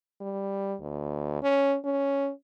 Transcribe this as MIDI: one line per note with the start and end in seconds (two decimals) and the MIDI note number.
0.21 0.75 55
0.81 1.42 38
1.42 1.76 61
1.85 2.31 61